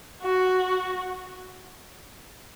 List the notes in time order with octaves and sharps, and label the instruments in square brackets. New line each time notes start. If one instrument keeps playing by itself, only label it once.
[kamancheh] F#4